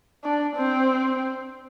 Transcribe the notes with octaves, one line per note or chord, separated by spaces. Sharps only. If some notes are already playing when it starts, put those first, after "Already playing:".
D4
C4